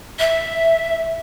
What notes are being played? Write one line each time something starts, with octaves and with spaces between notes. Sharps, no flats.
E5